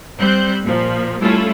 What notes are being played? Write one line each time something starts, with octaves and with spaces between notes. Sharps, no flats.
G3 C4 C5 F#6 G6
A#2 F3
G3 A3 C#4 E4 F4 A4